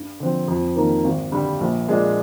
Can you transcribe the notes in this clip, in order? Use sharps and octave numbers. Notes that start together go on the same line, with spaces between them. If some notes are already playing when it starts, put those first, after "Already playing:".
Already playing: G2
D3 F3 C4
F2
D#3 A#3
G#1
G2 D3 G3
A#1
A#2 G#3 D4